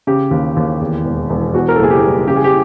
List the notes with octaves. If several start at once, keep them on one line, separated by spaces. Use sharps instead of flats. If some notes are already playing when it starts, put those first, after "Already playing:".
C#3 G4
D#2
D#2
E2
E1
E1
E2 F#4
A#4
A4
F#1 G#4
G4
G3
C#3 G4
G#4
G4